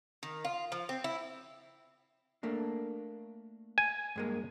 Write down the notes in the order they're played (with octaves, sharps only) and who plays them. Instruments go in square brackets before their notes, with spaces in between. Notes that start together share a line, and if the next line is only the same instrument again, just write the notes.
[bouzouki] D#3
F4
F3
C4
E4
[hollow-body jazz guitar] A3 A#3 D4
[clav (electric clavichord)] G#5
[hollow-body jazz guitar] G2 G#3 A#3